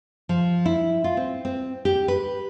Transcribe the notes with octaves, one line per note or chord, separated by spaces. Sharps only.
F3
E4
F4
C4
C4
G4
B4